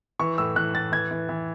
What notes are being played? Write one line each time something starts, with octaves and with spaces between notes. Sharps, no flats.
E3 C#6
A2 E6
E3 F#6
A2 A6
E3 G#6
E3
E3